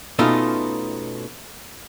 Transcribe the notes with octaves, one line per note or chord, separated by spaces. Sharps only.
B2 A3 C#4 D#4 F4